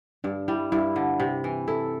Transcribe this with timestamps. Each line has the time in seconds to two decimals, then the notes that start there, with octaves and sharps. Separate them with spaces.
0.24 G2 D4
0.48 G3 E4
0.72 G2 E4
0.96 D3
1.20 C3
1.44 E3
1.68 E4 A4